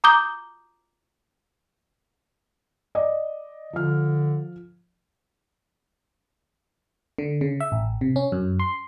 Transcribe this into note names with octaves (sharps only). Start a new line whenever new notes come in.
A#5 D6 D#6 G6 G7
D5 D#5
D3 F3 F6
D3
C#3
E5
A1
C3
C#4
F#2
C6